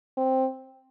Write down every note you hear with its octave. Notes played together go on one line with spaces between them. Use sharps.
C4